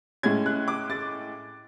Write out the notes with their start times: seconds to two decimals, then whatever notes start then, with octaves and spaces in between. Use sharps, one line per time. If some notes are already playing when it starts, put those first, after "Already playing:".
0.23 A2 G#3 C#4 G#6
0.46 F#6
0.68 D6
0.90 A6